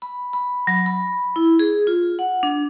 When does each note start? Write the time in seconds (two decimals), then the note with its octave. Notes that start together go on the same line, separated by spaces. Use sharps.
0.02 B5
0.33 B5
0.67 F#3
0.86 B5
1.36 E4
1.59 G#4
1.87 F4
2.19 F#5
2.43 D4